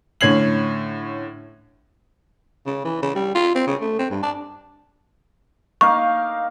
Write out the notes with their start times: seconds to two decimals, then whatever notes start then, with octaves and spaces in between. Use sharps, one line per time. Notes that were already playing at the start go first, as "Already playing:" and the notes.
0.21 A2 D3 C#4 G#6 C7 F#7
2.66 C#3
2.84 E3
3.02 C#3
3.15 G3
3.35 F4
3.55 C4
3.67 C#3
3.81 A3
3.99 C4
4.11 G2
4.23 D4
5.81 A#3 D#4 F5 C#6